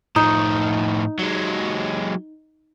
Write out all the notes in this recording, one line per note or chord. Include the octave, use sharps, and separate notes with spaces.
A2 F3 D#4
F#3 G#3